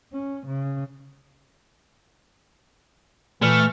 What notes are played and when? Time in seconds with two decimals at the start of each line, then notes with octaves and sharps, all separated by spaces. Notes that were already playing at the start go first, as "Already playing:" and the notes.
0.13 C#4
0.46 C#3
3.42 A#2 E3 A3 F6